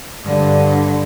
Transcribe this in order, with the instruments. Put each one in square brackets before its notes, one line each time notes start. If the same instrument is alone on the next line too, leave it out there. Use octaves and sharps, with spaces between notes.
[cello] G2 D3